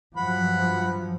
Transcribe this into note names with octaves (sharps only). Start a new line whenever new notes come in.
G2 F3 F#3 F#5 B5